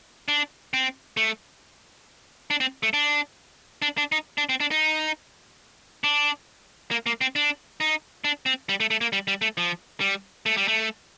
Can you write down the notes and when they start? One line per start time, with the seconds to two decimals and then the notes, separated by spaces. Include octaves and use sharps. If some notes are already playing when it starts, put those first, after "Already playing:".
0.28 D4
0.74 C4
1.17 A3
2.50 D4
2.60 C4
2.83 A3
2.93 D4
3.82 D4
3.98 D4
4.12 D#4
4.38 D4
4.49 C4
4.60 D4
4.71 D#4
6.04 D4
6.91 A#3
7.06 A#3
7.21 C4
7.36 D4
7.80 D#4
8.24 D4
8.46 C4
8.69 G3
8.80 A3
8.90 A3
9.01 A#3
9.13 G3
9.28 G3
9.42 A3
9.57 F3
10.00 G3
10.46 A3
10.57 G3
10.68 A3